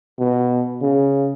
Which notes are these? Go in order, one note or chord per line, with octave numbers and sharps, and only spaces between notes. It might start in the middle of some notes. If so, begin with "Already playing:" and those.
B2
C#3